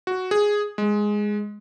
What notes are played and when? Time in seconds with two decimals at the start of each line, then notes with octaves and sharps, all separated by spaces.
0.07 F#4
0.31 G#4
0.78 G#3